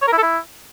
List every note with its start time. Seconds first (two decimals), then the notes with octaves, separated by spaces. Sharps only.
0.02 C#5
0.07 A#4
0.12 E4
0.18 A4
0.23 E4